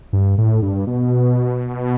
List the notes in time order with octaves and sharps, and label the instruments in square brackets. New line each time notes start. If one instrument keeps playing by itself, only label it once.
[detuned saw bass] G2
A2
G2
B2